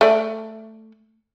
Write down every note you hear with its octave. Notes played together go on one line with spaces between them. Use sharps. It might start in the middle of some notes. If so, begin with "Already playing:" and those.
A3 D5